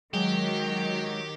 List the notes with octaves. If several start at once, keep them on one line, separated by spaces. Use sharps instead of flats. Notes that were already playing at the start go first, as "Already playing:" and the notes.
D#3 F#3 G#3 G4